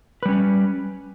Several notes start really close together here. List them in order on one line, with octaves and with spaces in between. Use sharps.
B4 G3 C#4